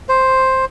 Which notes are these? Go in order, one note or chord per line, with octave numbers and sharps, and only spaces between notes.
C5